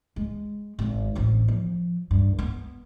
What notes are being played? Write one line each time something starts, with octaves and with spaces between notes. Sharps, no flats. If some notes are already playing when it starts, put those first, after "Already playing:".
G#3
G#1 G#2
A1 C4
F3
G2
B3